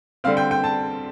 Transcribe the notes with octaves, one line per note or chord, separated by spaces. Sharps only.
D3 G3 C4 F5
G5
G5
A5